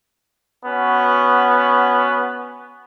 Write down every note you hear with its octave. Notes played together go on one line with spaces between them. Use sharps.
B3 C#4 F#4